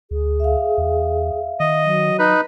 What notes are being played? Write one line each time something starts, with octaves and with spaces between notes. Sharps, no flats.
D2 G#4
E5 F5
E2
D#3 D#5
F#3
D#4 B4